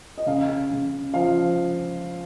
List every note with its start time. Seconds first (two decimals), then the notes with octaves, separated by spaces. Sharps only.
0.18 D#5
0.26 C#3 F5
0.70 C#3
1.14 F3 F5